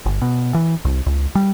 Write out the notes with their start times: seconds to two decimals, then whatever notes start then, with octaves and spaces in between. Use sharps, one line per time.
0.06 G1
0.22 B2
0.54 E3
0.85 C2
1.06 C#2
1.35 G3